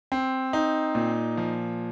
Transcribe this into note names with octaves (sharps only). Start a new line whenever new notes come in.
C4
D#4
A#2
F3